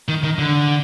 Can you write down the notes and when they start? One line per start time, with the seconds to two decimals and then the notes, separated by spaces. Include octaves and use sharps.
0.08 D#3
0.24 D#3
0.39 D3